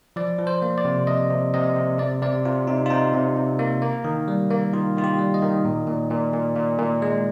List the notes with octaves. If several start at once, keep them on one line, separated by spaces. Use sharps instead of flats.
F3 D5
F3
C5
A#3
D5
C3
C3 D#5
C3
C3 D#5
C3
C3 D5
C3 D5
C3 F4
C3 D#4
F4
C3 D#4
C3
C3
A#3
A#3
D#3
G3
A#3
D#3 F4
D#3 F4
G4
G3
D#5
D#3
A#2
A#2
A#2
A#2
A#2
A#2
G#3